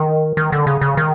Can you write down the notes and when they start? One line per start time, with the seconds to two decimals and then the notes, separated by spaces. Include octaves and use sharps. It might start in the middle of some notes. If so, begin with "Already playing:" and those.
Already playing: D#3
0.37 D#3
0.52 D3
0.67 C#3
0.81 C#3
0.97 D#3